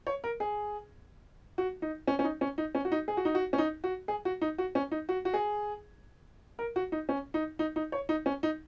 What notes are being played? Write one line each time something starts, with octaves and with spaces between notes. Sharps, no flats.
C#5
A#4
G#4
F#4
D#4
C#4
C#4
D#4
C#4
D#4
C#4
F#4
D#4
G#4
F#4
D#4
F#4
C#4
D#4
F#4
G#4
F#4
D#4
F#4
C#4
D#4
F#4
F#4
G#4
A#4
F#4
D#4
C#4
D#4
D#4
D#4
C#5
D#4
C#4
D#4